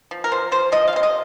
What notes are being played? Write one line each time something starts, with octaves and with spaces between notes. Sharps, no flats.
F3
A#4
F3 C5
F3 C5
F3 D#5
F5
C3 C5
D#5